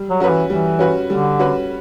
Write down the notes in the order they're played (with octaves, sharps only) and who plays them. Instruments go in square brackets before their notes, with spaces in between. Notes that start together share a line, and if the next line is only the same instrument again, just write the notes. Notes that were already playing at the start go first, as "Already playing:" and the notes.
Already playing: [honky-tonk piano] G3
[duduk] F#3
[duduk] F#3 [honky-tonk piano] C#4 F#4 B4
[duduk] E3
[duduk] E3 [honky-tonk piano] G3
[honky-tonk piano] C#4 F#4 B4
[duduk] D3 [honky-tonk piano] G3
[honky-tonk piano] C#4 F#4 B4